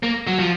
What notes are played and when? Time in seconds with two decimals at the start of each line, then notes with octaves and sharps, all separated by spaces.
0.03 A#3
0.27 F#3
0.39 F3